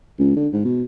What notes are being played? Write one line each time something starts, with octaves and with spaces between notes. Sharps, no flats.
C#2
D3
G#2
B2